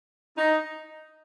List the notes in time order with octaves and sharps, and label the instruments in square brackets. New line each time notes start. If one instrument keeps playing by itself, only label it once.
[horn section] D#4